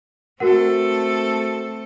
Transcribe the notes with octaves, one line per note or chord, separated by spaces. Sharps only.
A3 C4 F#4 A4 A#4 F#5